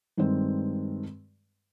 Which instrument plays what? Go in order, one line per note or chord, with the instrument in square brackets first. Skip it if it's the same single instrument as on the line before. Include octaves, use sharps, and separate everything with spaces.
[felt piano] G2 D#3 G#3 C4